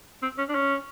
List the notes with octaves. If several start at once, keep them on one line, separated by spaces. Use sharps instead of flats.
C4
C#4
D4
C#4